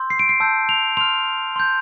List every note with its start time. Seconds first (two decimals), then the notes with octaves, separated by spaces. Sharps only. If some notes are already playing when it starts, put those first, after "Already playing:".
Already playing: C6 E6 G6
0.10 C7
0.19 D7
0.29 C7
0.40 A5 E6 G6
0.69 F7
0.97 C6 F6 F7
1.56 C6 G6